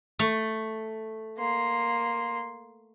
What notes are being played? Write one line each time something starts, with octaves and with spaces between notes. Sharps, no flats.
A3
A#3 C6